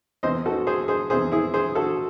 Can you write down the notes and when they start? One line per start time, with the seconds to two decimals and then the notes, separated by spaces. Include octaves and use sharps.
0.23 E2 C3 E3 C5 D#5
0.46 F#4 A4
0.67 G#4 C5
0.88 G#4 C5
1.10 E2 C3 E3 G#4 C5
1.32 E4 G#4
1.54 G#4 C5
1.75 F#4 A4